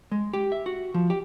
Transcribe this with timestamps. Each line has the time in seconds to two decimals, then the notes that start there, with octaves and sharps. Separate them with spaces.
0.11 G#3
0.34 G4
0.52 E5
0.66 F#4
0.94 F3
1.10 G4